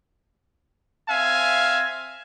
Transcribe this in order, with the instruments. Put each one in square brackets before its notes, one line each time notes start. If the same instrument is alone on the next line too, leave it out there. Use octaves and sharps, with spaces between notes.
[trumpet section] C4 E5 F5 G#5